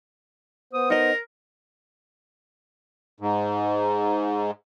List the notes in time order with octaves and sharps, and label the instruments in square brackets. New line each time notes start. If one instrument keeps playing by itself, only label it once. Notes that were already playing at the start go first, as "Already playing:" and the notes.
[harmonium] B3 C5 [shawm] D#6
[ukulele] D#4 D#5 [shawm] A#4
[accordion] G#2